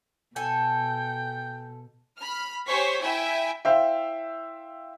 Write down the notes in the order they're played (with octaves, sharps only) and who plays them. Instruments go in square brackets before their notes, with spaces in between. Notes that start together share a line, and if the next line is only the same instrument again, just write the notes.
[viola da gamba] B2 [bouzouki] A4 G#5 [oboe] G5
[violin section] B5 F6
G4 C5 C#5 G#5 C#6 B6
E4 E5 G5 G#5
[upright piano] E4 C5 E5 F5 G5